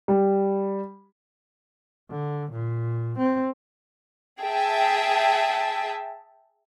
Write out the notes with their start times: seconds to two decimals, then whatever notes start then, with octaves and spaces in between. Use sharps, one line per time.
0.08 G3
2.10 D3
2.52 A#2
3.18 C4
4.41 G#4 E5 G5 A5